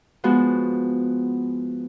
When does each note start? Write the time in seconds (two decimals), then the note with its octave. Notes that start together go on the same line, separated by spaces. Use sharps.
0.24 F3 G#3 B3 F#4